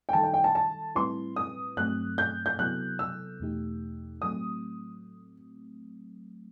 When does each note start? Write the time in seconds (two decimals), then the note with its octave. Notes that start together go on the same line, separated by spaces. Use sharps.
0.09 G5
0.13 D#3 G3 D#4 A4 A5
0.23 G5
0.34 G5
0.44 A5
0.55 A5
0.95 A2 G3 C4 E4 B4 C6
1.36 D#6
1.77 G2 F#3 A3 C4 F#6
2.18 G6
2.46 G6
2.58 C3 F#3 B3 E4 A4 F#6
2.99 E6
3.40 E2 B2 A3 D#4 G4
4.22 A2 F#3 A3 C4 D#6